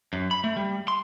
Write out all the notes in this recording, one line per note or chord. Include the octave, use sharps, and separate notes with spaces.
F#2
B5
A3
G3
C6